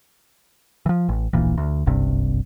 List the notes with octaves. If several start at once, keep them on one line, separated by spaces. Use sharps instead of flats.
E3 F3
A1
D1 A#1 A#2 E3
D2
F#1 C2 G2 C3